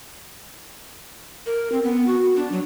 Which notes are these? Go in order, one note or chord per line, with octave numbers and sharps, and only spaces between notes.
A#4
C4
B3
F#4
D4
F#3